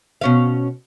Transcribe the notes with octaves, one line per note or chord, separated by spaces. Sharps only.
B2 C#4 F5